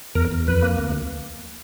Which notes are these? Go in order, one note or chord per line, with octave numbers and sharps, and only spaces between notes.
E2 A#4
E2
F2 B4
A#3
D2